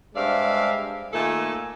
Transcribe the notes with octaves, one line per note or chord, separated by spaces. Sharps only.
G2 G#3 C4 D5 E5 F5
A#2 D#3 A3 A4 G#5